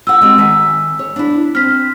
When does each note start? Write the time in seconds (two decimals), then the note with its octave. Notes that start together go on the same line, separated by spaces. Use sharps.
0.07 F4 F#5 E6
0.21 G#3 C4 F#4
0.38 D#3 E5 G#5
0.99 C#5
1.16 D4 E4
1.55 C4 F6 B6